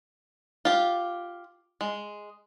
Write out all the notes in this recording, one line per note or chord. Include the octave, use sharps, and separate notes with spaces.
F4 G4
G#3